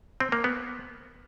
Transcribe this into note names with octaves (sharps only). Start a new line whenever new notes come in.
C4
A#3
B3